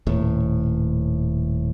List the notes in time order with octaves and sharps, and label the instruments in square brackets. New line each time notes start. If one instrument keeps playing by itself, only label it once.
[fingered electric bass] D#1 A2